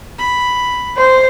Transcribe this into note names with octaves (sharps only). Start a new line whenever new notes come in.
B5
C5